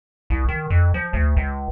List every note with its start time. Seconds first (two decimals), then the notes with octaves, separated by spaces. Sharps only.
0.30 C2
0.49 D#3
0.70 F2
0.94 F3
1.13 D2
1.37 C#2